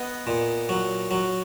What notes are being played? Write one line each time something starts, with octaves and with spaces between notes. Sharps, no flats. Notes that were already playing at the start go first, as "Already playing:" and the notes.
Already playing: B3 D#5
A#2
F#3
F#3